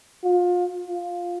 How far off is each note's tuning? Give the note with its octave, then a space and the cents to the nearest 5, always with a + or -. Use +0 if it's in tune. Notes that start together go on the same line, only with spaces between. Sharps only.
F4 +30
F4 +5